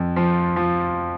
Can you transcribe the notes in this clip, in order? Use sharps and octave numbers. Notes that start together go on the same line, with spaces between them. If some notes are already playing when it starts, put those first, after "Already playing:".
Already playing: F2
F3
F3